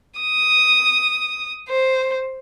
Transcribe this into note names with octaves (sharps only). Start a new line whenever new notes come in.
D#6
C5